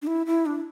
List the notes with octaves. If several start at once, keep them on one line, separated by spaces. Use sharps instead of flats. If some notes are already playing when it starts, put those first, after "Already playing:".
D4
E4
E4
D4